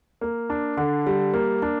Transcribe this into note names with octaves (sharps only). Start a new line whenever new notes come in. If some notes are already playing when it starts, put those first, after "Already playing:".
A#3
D4
D3
G3
A#3
D4